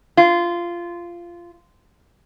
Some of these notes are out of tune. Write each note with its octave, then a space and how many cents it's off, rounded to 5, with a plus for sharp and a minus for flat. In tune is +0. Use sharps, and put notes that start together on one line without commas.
F4 -15